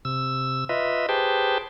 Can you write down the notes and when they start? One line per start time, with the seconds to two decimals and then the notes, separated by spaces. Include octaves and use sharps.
0.05 C3 E6
0.69 F4 B4 D#5 E5
1.09 G4 G#4 B4 C5 G5 A5